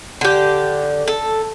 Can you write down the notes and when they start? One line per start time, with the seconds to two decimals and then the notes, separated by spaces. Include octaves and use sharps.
0.21 D3 G4
1.08 A4